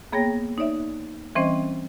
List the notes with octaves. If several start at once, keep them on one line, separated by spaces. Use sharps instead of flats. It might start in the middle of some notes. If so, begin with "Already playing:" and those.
A#3 B3 G#4 C#5 G5 A#6
D#4 C#5 D5 E5
E3 G3 C4 C#4 C5 D#5